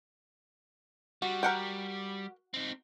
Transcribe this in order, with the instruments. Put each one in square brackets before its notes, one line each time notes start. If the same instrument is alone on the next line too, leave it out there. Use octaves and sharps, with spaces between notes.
[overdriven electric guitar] G3 [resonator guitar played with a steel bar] F#4
[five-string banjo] A#4 F#5 G5
[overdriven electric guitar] C4 D#4